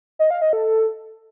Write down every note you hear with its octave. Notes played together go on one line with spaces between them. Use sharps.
D#5
F5
D#5
A4